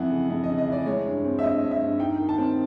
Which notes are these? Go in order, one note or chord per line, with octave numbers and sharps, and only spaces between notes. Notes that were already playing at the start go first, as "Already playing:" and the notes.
Already playing: F2 E3 F#5
C#3
F2
D#5
C#3
D#5
E3 D5
G#3 C#5
G2
C4
E5
G2 D#5
G2
E5
G2
D#4 G5
D#3
A5
C4